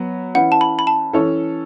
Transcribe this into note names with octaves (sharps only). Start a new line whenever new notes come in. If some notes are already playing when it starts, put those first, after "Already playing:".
Already playing: F#3 B3
E3 C#4 E4 B4 F#5
A5
B5
B5
A5
E3 C#4 A4 C#5